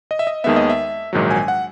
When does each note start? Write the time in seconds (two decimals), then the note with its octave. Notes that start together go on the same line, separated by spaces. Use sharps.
0.11 D#5
0.19 E5
0.27 D#5
0.44 D#2 D#3 G#3 B3 E5
0.56 D#5
0.70 E5
1.13 A#1 G#2 D#3 F#3
1.31 G#5
1.48 F#5